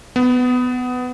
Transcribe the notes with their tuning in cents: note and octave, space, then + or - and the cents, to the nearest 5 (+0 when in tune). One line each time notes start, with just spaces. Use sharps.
B3 +15